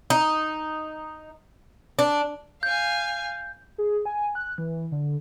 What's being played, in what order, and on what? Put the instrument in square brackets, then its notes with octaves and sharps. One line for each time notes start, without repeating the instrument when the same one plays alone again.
[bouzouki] D#4
D4
[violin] F5 G#5 [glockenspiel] G6
[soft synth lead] G#4
G#5
F#6
E3
D3